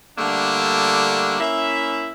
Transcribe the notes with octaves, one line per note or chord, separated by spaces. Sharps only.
D3 G3 A3 A#3 D4
A#3 C#4 E4 E5